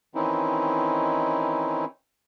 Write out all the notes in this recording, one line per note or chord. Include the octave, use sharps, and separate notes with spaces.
D#3 E3 C4 C#4 D#4 E4